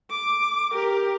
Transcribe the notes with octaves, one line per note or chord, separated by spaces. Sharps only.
D6
G4 A#4